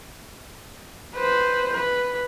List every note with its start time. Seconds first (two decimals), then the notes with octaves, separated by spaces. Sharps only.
1.15 B4 C5
1.73 B4